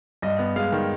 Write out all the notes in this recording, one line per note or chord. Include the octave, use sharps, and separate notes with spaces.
G2 D#5
B3
G#3 F5
D#3